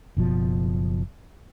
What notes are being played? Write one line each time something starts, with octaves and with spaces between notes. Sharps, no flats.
F#1 B2 F3